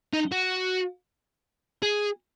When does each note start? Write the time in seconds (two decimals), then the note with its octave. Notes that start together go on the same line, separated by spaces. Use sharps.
0.13 D#4
0.32 F#4
1.82 G#4